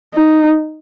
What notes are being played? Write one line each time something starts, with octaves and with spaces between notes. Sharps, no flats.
D#4